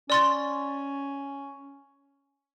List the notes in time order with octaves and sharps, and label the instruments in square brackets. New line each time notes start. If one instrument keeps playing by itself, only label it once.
[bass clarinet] C#4 [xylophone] D5 C6 A6